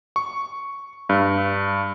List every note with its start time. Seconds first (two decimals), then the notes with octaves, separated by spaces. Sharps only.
0.16 C#6
1.09 G2